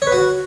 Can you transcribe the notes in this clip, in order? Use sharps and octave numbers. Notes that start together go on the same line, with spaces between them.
C#5
B4
F#4